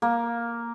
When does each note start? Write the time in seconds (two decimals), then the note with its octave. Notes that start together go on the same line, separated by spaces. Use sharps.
0.02 A#3